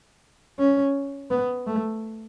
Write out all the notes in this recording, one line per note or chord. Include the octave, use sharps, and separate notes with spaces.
C#4
B3
A3